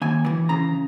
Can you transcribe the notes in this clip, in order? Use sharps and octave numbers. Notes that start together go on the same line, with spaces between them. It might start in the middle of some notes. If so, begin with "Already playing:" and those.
D#2 G#5
E3
C#3 A#5